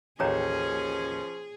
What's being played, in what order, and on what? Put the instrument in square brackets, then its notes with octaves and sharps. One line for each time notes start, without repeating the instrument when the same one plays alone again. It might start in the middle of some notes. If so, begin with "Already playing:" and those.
[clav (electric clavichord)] A1 D#2 [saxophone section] F3 C#4 [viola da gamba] G#4 [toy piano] C#5 G5 A#5